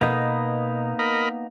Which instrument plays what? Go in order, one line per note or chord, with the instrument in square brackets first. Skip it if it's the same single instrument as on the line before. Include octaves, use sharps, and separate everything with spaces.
[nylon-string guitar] B2 B4 [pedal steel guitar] A#3 B3 D#4
[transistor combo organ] A#4 D#5 B5